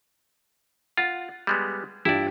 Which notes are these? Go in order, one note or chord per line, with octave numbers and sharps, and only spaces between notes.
F4 F#5 A6
G3 G#3 B3
G2 E4 F4 G4 D5